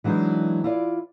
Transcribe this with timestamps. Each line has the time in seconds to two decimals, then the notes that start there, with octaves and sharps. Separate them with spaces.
0.04 E3 F#3 G#3 D4 D#4
0.64 E4 F4 D5